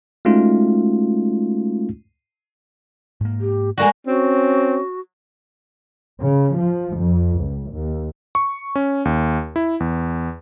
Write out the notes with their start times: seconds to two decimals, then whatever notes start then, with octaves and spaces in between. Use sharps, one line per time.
0.25 G#3 A3 C#4 D#4 F4 F#4
3.21 G#2 A#3
3.41 G4
3.78 G#3 A#3 F#4 D5
4.07 C4 C#4 F#4
6.21 C#3
6.57 F3
6.96 F2
7.36 C#2
7.70 D#2
8.35 C#6
8.76 C#4
9.05 D#2
9.56 E4
9.80 E2